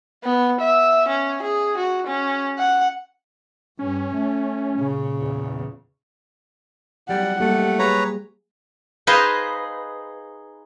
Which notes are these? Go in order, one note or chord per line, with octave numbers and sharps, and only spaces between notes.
B3
E5
C#4
G#4
F#4
C#4
F#5
G2 C#4
A3
A#2 C#3
E2
F#3 G3 F#5
G3 A3 A#3 G4
G#4 B4 C#5 A#5
D#4 G#4 B4 C5 D#5 F5